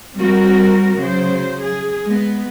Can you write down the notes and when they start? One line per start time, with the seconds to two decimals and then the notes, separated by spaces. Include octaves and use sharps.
0.16 G3 C4 F#4 A#4
0.99 C#3 F#3 C5
1.62 G#4
2.06 G#3 B3